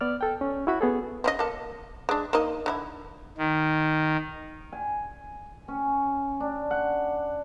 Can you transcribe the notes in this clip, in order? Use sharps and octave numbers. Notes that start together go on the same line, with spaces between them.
B3 D5 F6
A4 G5
C#4
E4 F#4 B5
B3 G#4 A4
C4 C#4 D#5
A#3 A4
G#3 D4
A#3 D#4 D#5
D3 D#4 E4
D#3
G#5
C#4
D4
F#5